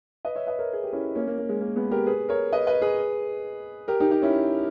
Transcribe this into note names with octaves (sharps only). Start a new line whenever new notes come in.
B4 D#5
C#5 E5
B4 D#5
A#4 C#5
G#4
G4
C#4 E4
A#3 C#4
A#3
A#3
G#3
A#3
G#3 B3
G4 A#4
G#4 B4
A#4 C#5
B4 D#5
B4 D#5
G#4 B4
G4 A#4
D#4 G4
D#4 G4
C#4 E4